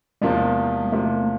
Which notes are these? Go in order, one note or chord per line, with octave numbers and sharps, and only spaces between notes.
E2 C3 F3 G#3 A#3
E2 C3 F3 A3 A#3